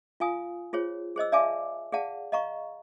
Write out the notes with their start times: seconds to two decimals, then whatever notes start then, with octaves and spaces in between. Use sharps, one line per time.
0.20 F4 F5 G#5 D#6
0.73 F4 G#4 C5 C#5
1.16 G#4 C5 D#5 E6
1.32 D5 E5 F5 G#5 A5 D6
1.92 G#4 D5 F5 F#5 A5
2.32 D#5 F5 A#5 C#6